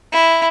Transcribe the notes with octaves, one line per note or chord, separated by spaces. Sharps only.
E4